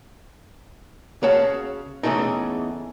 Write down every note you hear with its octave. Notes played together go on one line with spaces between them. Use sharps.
C#3 F#4 C#5 F5 A5
E2 C#3 E3 A3 D#4